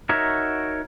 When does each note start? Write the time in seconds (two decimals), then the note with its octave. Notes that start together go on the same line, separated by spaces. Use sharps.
0.09 D#4 F#4 A#4 C#5 E5